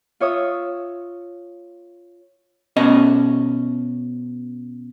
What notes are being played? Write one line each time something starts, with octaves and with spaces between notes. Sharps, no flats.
F4 C#5 E5 D#6
B2 C#4 D#5